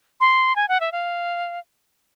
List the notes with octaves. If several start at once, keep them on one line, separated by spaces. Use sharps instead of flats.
C6
G#5
F#5
E5
F5